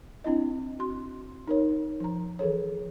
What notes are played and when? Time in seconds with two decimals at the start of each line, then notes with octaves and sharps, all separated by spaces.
0.24 C4 D4 E4 D#5
0.79 F#4 C6
1.47 D#4 A#4 C#5
2.00 F3 A#5
2.39 E3 G#4 A4 C#5